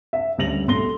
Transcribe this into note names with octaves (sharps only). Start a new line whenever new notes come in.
E5
D2 G3 C#4 A#6 F7 F#7
B1 A3 C6 A#6 G7